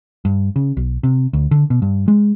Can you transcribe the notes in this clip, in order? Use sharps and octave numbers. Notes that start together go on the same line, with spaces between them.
G2
C#3
B1
C3
D2
D3
B2
G2
G#3